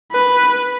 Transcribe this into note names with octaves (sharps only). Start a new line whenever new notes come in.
B4